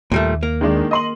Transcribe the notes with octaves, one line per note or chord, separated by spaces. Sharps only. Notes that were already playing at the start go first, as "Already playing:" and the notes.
D#2 A#2 G3 A3
A#3
D#3 G#3 D4
D#5 C6 F#7